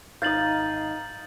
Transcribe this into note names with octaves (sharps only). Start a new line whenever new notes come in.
G#1 D#4 D#5 F5 G6 A6 F#7